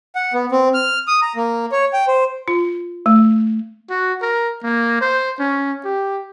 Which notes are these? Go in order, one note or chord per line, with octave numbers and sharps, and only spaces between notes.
F#5
B3
C4
F6
D#6
A#5
A#3
C#5
G5
C5
F4
A3
F#4
A#4
A#3
C5
C#4
G4